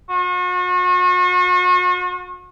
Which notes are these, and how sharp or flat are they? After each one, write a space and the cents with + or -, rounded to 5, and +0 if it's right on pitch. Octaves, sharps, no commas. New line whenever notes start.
F#4 -40